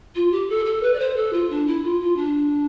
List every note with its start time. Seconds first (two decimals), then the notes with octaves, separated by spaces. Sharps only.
0.15 F4
0.31 G4
0.49 A4
0.65 A4
0.82 B4
0.93 D5
0.99 C5
1.16 A4
1.32 F4
1.49 D4
1.66 E4
1.83 F4
2.00 F4
2.16 D4